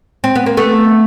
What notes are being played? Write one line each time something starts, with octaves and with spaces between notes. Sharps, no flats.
C4
B3
A#3
A3 B3